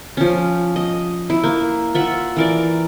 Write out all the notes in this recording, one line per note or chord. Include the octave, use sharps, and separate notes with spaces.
F3 C#4
D#5
E4
A#3
F4 E5 F#5
E3 A#4 D5